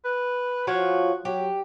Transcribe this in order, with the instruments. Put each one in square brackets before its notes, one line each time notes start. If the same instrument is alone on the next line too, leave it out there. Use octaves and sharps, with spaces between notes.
[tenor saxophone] B4
[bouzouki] F3 F4 C#5 [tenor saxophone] F#4
[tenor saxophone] F#3 [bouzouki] G4